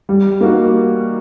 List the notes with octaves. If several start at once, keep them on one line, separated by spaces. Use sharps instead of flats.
G3
A#3 D#4 F#4